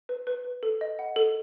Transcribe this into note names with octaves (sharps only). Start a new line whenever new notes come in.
B4
B4
B4
A4
D#5
F#5
A4